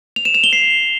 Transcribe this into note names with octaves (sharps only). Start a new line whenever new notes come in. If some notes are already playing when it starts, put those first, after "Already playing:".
F7
E7
F7
G7
C7